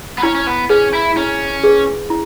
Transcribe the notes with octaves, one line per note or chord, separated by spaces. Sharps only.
B3
C#4 E4
C#4
B3
C#4 G#4 B4
E4
C#4 E4
G#4 B4
E4